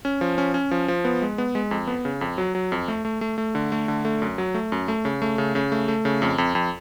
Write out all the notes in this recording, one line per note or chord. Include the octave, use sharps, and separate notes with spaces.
C#4
F3
C#4
C#4
F3
F3
B3
G#3
B3
G#3
F2
B3
C#3
F2
F#3
F#3
F2
A3
A3
A3
A3
D3
A3
D3
A3
F#2
F#3
A3
F#2
A3
C#3
A3
C#3
C#3
A3
A3
C#3
F2
F2
F2